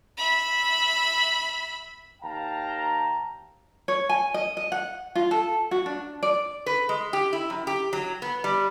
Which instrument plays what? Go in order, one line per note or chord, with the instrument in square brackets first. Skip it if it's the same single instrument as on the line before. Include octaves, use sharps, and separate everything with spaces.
[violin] E5 B5
[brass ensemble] D#2 F5 G5 A5 A#5
[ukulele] C#5
G#5
D#5
D#5
F#5
F4
A4
F#4
D4
D5
[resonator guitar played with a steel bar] B4
G#3
G4
E4
F#2
G4
F#3
B3
G3